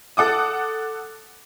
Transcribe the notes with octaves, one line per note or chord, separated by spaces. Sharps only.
A4 F#5 D6 D#6